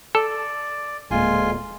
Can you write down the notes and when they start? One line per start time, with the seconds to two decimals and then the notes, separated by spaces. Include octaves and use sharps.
0.15 A4 D5
1.11 D1 D2 A#2 G#3 A#3 F4 G#5 C6